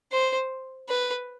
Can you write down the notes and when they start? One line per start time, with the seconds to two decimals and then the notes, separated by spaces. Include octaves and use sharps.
0.12 C5
0.89 B4